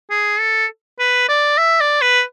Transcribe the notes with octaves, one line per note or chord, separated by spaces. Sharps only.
G#4
A4
B4
D5
E5
D5
B4